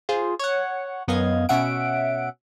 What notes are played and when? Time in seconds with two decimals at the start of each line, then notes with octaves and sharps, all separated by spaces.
0.09 F4 G#4 C5
0.39 C#5 F#5
1.08 F#2 B3 D#5 F5 G#6
1.49 B2 C#4 E5 F#5 D7